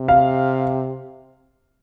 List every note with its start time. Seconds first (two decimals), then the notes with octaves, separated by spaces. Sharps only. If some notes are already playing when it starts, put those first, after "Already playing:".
Already playing: C3
0.08 F5